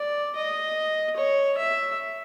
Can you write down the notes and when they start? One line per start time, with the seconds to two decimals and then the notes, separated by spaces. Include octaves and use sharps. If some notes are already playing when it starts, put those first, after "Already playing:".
Already playing: D5
0.34 D#5
1.16 C#5
1.57 E5